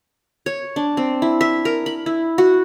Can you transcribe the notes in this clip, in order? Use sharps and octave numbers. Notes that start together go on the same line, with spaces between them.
C#5
D4
C4
E4
E5
A#4
B5
E4
F#4